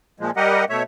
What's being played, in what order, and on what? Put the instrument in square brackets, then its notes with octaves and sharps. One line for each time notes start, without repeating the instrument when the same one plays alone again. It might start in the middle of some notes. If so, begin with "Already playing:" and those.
[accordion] A#2 F3 G#3
G3 G4 A#4 D#5 F#5
B2 A3 C#5 E5